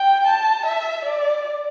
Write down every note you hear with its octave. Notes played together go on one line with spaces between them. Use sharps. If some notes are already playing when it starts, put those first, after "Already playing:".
Already playing: G5
A5
E5
D5